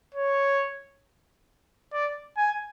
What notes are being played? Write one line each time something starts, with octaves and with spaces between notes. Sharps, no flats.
C#5
D5
G#5